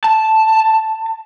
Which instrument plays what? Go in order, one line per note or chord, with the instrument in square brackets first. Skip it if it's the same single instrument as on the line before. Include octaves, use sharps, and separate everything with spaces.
[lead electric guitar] A5